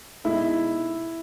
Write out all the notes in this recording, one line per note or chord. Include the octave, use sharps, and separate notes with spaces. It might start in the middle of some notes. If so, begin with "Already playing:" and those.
B2 G#3 D#4 E4 A4 D#5